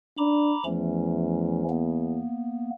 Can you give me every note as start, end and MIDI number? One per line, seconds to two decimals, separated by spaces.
0.18 0.55 62
0.18 0.64 82
0.18 0.64 83
0.18 0.64 86
0.65 2.23 40
0.65 1.64 53
0.65 1.64 57
0.65 1.64 61
1.70 2.71 58
1.70 2.71 59